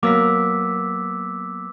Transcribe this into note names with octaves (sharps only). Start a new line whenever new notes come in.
F#3 A#3 B3 D6 E6 B6